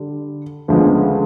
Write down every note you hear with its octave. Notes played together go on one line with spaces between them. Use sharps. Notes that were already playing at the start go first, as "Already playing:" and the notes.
Already playing: D3 G3
D2 C#3 F3 G#3 B3